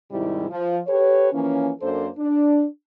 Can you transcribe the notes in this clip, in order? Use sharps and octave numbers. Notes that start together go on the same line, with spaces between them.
G#2 C3 D#3 G3 E4
F3
G4 A4 B4 C#5
E3 F3 A#3 C#4
F#2 A#3 D4 A4 C5
D4